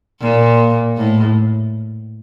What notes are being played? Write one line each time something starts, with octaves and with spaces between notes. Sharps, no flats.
A#2
A2